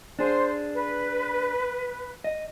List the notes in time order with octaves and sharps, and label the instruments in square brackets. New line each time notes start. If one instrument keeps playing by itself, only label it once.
[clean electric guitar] D4 G#4 [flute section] C5
[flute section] B4
[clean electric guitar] D#5